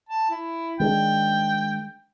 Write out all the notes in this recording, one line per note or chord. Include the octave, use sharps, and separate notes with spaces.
A5
E4
D#3 G#3 D4 G5